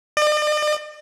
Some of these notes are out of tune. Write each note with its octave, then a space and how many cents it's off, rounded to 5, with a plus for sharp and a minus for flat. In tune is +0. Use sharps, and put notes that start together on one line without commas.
D5 +45